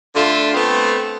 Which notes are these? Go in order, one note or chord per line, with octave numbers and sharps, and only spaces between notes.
D3 A3 F4
A3 B3 C4